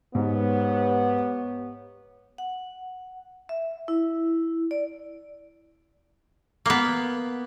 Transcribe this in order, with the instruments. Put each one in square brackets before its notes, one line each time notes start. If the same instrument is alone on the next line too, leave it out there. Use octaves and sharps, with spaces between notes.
[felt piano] G#2 [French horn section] B3 G4 C#5
[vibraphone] F#5
E5
E4
D5
[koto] A#3 B3